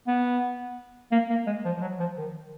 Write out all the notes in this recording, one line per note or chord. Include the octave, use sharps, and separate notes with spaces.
B3
A#3
A#3
G#3
F3
F3
F#3
F3
D#3